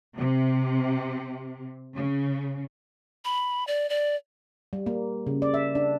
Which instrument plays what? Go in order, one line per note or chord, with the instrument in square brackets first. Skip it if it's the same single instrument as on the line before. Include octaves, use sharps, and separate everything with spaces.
[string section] C3
C#3
[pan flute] B5
D5
D5
[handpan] G3
A#3
C#3
D5
E5
D4